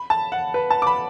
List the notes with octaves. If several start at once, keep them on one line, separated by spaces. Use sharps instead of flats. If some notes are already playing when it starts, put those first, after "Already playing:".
Already playing: B5
A5
F#5
B4
A5
D6
B5